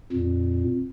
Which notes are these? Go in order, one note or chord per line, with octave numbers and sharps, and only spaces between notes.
F2 A#2